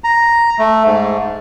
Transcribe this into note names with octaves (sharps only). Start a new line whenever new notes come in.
A#5
A3
G#2